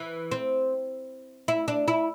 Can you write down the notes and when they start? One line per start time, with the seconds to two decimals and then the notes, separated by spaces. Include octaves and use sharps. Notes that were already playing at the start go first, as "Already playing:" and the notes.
Already playing: E3
0.31 C4
1.48 E4
1.68 D4
1.88 E4